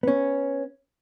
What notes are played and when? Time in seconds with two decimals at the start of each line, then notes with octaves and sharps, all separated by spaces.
0.03 B3 C#4